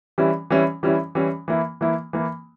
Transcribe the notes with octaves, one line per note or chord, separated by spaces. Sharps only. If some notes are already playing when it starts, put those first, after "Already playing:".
E3 G3 C#4 E4
E3 G3 C#4 E4
E3 G3 C#4 E4
E3 G3 C#4 E4
E3 A#3 E4
E3 A#3 E4
E3 A#3 E4